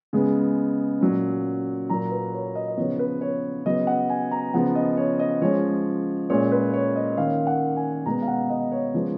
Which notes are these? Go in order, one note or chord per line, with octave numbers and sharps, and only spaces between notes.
C#3 G#3 B3
A#2 F#3 C#4
A#2 F#3 A#3 A#5
B4
C#5
D#5
D#5
C#3 F3 B3 C#5
B4
C#5
C#3 F#3 B3 D#5
F#5
G#5
A#5
C#3 F3 B3 F#5
D#5
C#5
D#5
F3 G#3 C#4 C#5
A#2 G#3 C#4 C#5
B4
C#5
D#5
D#3 A#3 C#4 F5
F#5
G#5
B2 G#3 B3 A#5
F5
F#5
D#5
C#5
C#3 F3 G#3 B3